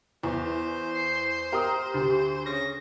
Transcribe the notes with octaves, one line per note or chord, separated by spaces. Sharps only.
E2 C5
C7
G4 A#4 D#6
D2
C#3 A#6